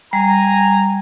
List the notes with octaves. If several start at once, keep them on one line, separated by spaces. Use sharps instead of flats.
G3 G#5 A#5